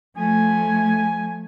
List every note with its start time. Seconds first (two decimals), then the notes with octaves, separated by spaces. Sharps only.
0.17 F3 A3 G#5